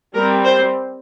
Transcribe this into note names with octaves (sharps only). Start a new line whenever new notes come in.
G3 C4 A#4
C5